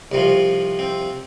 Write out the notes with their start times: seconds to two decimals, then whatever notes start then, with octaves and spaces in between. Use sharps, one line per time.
0.12 C2 C3 F3
0.79 C4